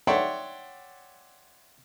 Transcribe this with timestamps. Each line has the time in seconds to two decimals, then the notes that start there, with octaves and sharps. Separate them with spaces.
0.07 C#5 D5 E5 F#5 G5 C6